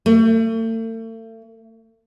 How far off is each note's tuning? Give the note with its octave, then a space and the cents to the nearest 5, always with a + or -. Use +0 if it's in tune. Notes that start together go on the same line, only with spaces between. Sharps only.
A3 +40